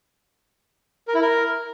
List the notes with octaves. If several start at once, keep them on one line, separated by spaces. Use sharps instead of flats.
A#4
E4
A#4